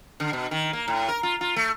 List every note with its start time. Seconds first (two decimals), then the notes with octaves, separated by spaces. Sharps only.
0.20 D3
0.33 B2
0.51 D#3
0.73 A#3
0.88 A2
1.08 A#4
1.23 F4
1.41 F4
1.56 A3